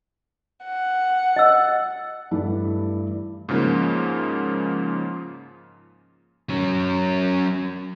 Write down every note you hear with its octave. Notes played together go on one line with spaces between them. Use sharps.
F#5
D#5 E6
G2 E3 A3 E4
G#2 C#3 F3 A#3
F#3 C#4